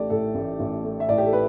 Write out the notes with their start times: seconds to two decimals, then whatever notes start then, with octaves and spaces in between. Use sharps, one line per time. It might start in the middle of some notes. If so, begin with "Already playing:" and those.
Already playing: A1 A3 G4 D5
0.10 A2 A4
0.35 A1
0.60 A1
0.84 A3
1.00 E5
1.09 A2 D5
1.18 G4
1.26 A4
1.33 B4